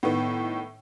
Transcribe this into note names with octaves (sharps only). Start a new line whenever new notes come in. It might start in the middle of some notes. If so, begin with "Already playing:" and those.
A2 D#3 B3